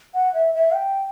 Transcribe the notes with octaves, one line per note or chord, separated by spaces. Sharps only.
F#5
E5
E5
G5